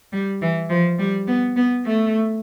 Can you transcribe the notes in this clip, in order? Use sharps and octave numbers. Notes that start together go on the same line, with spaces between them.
G3
E3
F3
G3
B3
B3
A3